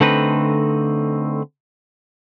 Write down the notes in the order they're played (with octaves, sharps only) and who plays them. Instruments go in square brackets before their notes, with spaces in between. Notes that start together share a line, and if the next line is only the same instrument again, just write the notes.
[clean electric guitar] D3 A3 C4 D#4 B4